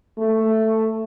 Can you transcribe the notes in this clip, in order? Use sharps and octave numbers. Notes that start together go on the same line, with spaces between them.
A3